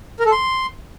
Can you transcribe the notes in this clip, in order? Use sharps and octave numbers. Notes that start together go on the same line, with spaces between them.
A#4
A4
C6